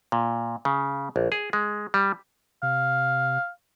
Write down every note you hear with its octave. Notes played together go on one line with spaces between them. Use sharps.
A#2
C#3
A#1
G#4
G#3
G3
C3 F5